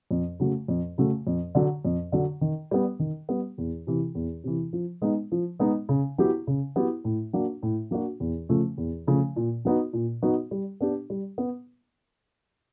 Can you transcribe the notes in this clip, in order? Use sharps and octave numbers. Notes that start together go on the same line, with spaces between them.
F2
C#3 F#3 A3
F2
C#3 F#3 A3
F2
D3 F#3
F2
D3 F#3
D#3
G3 B3
D#3
G3 B3
E2
C3 E3
E2
C3 E3
F3
G#3 B3 D#4
F3
G#3 B3 D#4
C#3
F#3 B3 E4 G4
C#3
F#3 B3 E4 G4
A2
F#3 A#3 D4 F#4
A2
F#3 A#3 D4 F#4
E2
C#3 F3 A3 C#4
E2
C#3 F3 A3 C#4
A#2
F#3 B3 D#4 F#4
A#2
F#3 B3 D#4 F#4
G3
B3 D4 G4
G3
B3